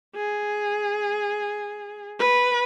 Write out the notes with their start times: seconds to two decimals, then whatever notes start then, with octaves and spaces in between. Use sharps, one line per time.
0.16 G#4
2.19 B4